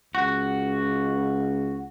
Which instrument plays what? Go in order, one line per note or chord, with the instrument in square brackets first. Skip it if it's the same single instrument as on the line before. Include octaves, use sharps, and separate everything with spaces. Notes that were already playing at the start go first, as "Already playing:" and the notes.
[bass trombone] C#2 [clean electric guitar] F#4